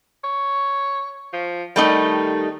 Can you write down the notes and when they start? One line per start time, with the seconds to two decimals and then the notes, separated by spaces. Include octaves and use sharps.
0.24 C#5
1.33 F3
1.76 D#3 G3 A3 D#4